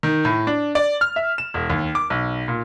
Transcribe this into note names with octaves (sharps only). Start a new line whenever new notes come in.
D#3
A2
D4
D5
F6
E5
E7
E1
D#2
D6
B1
A#2